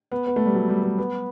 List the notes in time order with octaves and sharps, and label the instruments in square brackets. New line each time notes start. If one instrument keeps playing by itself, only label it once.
[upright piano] B3
B3
A3
G3
F#3
G3
A3
B3